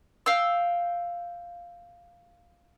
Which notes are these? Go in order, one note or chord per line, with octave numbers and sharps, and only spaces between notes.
F5 G5 E6